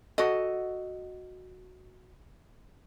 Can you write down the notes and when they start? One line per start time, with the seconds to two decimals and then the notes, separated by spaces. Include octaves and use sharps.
0.18 F#4 A4 D#5